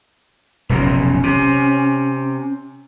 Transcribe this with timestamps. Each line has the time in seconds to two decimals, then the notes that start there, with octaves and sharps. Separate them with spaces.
0.69 F1 B1 A#2 C#4
1.23 C3